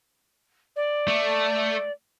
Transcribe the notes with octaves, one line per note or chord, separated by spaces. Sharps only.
D5
A3